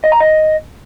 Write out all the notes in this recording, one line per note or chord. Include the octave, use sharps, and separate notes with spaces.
D#5
A#5
D#5